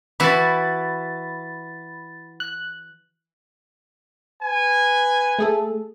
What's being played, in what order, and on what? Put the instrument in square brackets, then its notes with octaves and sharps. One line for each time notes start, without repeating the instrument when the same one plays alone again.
[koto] E3 E4 F#4 [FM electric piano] B5 A6
[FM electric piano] F#6
[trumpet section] B4 G#5
[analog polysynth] A3 G#4 A4